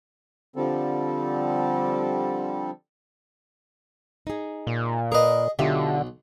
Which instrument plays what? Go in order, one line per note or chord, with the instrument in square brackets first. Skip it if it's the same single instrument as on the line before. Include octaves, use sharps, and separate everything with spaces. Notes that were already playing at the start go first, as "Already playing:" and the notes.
[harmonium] D3 F3 G3 C4 A4
[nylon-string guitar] D#4 G#4
[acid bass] A#2
[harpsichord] G#4 D#5 [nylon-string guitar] A#4 B4
[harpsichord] B1 [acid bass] D3 [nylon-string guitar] F4 G4 E5